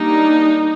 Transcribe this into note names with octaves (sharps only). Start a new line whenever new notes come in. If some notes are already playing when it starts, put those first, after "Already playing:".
Already playing: G3 A#3 D4 D#4